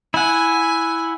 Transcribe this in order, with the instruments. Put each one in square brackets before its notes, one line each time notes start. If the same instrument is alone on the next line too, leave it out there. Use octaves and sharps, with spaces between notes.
[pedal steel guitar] E4 F#5 [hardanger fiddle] G#5